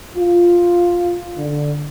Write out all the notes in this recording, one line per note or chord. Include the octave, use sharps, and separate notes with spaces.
F4
D3